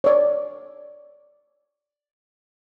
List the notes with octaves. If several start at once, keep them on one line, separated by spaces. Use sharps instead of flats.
C#5 D5